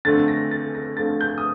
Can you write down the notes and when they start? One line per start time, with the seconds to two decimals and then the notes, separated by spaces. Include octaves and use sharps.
0.05 D3 F3 A3 C4 A6
0.28 A#6
0.51 A6
0.75 A#6
0.97 D3 F3 A3 C4 A6
1.21 G6
1.38 D#6